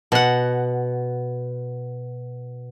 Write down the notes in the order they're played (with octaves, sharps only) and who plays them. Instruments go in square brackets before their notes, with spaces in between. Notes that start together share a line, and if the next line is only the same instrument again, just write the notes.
[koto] B2 F#5